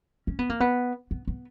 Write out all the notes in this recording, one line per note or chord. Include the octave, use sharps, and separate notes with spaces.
C#4
B3
A#3
B3
B3
B3